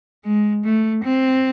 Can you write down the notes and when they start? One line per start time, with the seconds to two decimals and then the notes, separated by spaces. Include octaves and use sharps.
0.25 G#3
0.64 A3
1.03 C4